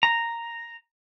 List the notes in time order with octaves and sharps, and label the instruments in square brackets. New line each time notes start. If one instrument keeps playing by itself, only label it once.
[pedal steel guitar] A#5